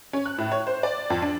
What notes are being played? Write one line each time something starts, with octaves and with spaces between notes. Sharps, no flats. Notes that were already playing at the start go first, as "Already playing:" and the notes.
C#4
F#6
A2
C#5
C5
D5
F2
D4